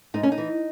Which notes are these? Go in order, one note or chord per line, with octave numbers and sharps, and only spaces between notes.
G#2 D#4
C#4
D#4
E3